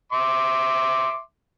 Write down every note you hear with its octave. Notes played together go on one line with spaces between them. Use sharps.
E5 C6 D6